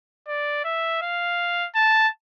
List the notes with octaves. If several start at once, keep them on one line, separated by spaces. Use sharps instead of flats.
D5
E5
F5
A5